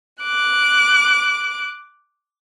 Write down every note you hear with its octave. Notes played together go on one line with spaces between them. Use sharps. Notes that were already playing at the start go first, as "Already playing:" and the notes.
D6 F#6